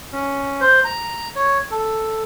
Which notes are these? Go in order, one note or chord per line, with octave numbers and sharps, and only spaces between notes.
C#4
C5
A#5
C#5
A4